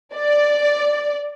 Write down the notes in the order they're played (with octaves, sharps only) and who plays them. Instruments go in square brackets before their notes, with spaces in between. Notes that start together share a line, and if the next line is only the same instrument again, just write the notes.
[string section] D5